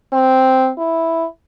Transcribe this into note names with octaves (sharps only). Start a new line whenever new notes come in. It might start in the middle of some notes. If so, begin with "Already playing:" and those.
C4
E4